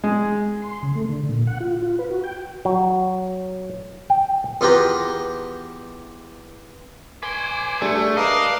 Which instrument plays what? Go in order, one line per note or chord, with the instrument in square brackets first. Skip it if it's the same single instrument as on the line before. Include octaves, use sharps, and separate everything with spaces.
[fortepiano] G#3
[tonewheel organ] C6
C#3
A3
D3
A#2
F#5
F4
F4
B4
F#4
G5
[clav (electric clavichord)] F#3
G5
[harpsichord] E2 B3 F4 G4 B4 A#5
[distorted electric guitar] B4 C6 [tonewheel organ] G#5 D6
[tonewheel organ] G3 D4 G#4 [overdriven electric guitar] A3
[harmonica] D4 A#4 [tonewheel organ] B4 [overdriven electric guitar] D#5 [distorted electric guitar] F5